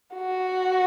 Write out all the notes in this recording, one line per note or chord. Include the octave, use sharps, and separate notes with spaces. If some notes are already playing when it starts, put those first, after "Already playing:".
F#4